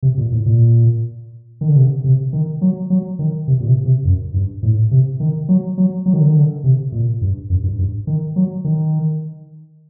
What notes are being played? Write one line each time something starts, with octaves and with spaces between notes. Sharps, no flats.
C3
A#2
A2
A#2
D#3
D3
C3
C3
D#3
F#3
F#3
D#3
C3
A#2
C3
C3
F#2
G2
A2
C3
D#3
F#3
F#3
F#3
D#3
D3
D#3
D3
C3
A#2
G2
F#2
G2
G2
D#3
F#3
D#3